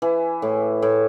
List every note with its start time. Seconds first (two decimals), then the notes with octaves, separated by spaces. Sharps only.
0.02 E3
0.42 A2
0.82 A2